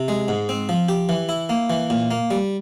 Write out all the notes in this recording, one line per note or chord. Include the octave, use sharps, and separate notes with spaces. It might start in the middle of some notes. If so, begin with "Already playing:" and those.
Already playing: C3
G#3
G#2
C4
F3
G4
E3
E4
A#3
E3
A#2
A#3
G3